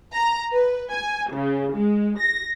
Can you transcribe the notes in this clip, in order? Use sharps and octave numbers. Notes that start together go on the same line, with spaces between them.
A#5
B4
G#5
C#3
G#3
A#6